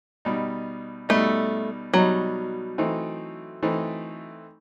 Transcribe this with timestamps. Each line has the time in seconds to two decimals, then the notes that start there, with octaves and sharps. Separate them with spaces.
0.25 B2 G3 D#4
1.09 B2 G3 A3 D#4
1.93 B2 F#3 G3 D#4
2.78 E3 A3 C4 D#4
3.62 E3 A3 C4 D#4